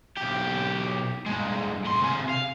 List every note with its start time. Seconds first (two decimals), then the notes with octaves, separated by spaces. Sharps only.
0.17 B1 G4
1.26 G2 G#3
1.85 A2 C6
2.00 C3 G#4
2.29 F5